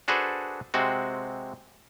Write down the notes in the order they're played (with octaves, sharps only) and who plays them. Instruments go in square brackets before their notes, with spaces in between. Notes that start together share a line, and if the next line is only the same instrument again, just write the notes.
[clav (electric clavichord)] D4 F#4 G#4 A4 B4 C5
C3 G#3 C4 F#4